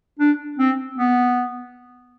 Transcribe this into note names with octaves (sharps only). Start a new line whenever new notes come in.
D4
C4
B3